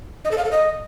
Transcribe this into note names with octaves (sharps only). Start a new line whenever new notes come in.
D#5
A4
F5
A4
D#5